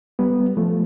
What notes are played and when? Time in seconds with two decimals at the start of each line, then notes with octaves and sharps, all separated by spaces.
0.19 G3 B3
0.57 F3 A3